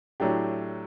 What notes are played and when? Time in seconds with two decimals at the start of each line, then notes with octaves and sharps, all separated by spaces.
0.20 A2 F#3 A3 D4 G4